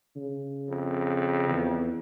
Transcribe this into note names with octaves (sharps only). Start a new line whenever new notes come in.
C#3
F2
E2